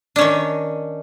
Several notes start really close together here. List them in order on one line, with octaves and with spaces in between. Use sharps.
D4 C#4 D#3